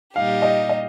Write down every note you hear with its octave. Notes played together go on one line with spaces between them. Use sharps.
A#2 G3 D#4 G4 F5
D#5
D#5